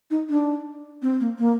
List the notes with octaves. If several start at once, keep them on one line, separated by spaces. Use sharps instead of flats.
D#4
D4
C4
A#3
A#3